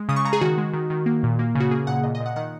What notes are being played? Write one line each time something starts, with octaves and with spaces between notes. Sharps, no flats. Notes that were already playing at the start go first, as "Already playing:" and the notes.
Already playing: G#3
C#3 D#6
C#6
C#3 A#5
G#4
D#3 F#4
G#3
D#3
D#3
A#3
A#2
A#3
C#3
F#4
A#3 G#4
A#2 F#5
A#2 D#5
D#5
A#2
F#5
D#3 F#5